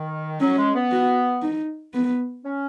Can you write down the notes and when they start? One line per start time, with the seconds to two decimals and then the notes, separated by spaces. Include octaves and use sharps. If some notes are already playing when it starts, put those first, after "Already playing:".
Already playing: D#3
0.40 F#3 C#4
0.57 G#3
0.75 B3
0.92 F#4
1.43 D#4
1.94 B3
2.44 C#4